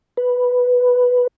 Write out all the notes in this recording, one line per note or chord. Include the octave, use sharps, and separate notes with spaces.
B4